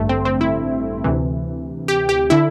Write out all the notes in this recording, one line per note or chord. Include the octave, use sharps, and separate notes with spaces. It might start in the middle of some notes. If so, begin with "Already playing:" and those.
Already playing: A1 G2 D3 A3
C4
C4
E4
D2 C3 E3
G4
G4
D3 E4